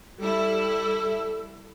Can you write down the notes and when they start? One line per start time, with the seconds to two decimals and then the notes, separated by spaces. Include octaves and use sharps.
0.19 G3 E4 A4